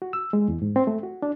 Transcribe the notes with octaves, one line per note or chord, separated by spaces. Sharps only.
F#4
E6
G#3
E2
G#2
C4
A3
F#4
D4